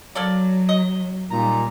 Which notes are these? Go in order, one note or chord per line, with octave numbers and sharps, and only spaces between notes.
F#3 A#3 A4 D5
D#5
A#2 G3 D#4 F4 A#5